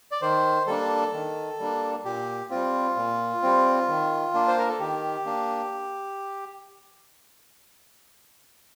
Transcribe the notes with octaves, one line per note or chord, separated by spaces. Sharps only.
D5
D#3 C5
G3 A#3 D4 A4
D#3
G3 A#3 D4
A#2 G4
G3 C4 F4
A#2
G3 C4
D#3
A#3 D4
C5
A#4
A4
D#3 G4
A#3 D4